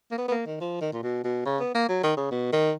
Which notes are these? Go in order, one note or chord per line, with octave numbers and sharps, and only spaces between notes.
A#3
B3
B3
A#3
D#3
F3
D#3
A#2
B2
B2
C#3
B3
A#3
F#3
D#3
C#3
B2
D#3